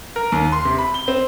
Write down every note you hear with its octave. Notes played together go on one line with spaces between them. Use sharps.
A#4
D#2
C6
C3
B5
G7
C4